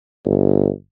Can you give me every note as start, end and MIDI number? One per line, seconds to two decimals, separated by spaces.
0.25 0.68 31